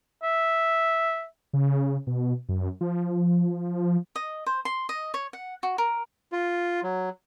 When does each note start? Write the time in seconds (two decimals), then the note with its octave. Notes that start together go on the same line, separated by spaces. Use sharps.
0.23 E5
1.53 C#3
2.07 B2
2.49 F#2
2.81 F3
4.16 D#5
4.46 C5
4.65 C6
4.89 D#5
5.14 C#5
5.33 F#5
5.63 F#4
5.78 A#4
6.32 F4
6.83 F#3